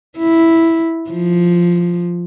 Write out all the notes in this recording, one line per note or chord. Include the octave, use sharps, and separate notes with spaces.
E4
F3